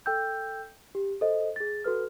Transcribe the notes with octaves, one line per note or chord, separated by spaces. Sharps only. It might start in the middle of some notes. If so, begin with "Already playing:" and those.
A4 G5 E6 G6
G4
A4 C5 D#5
G#4 A6
F#4 A4 B4 F6